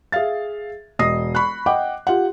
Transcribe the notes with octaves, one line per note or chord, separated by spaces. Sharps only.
G#4 E5 F5 A6
E1 D#5 D#6 A#6 C7
B5 C#6 F#6
D#5 F#5 G5 D6
F4 G4 F#5